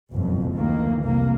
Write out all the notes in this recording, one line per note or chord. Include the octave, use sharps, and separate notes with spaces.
F#1 B1 F2 G#2
D2 D#3 E3 A#3
F1 C2 A#3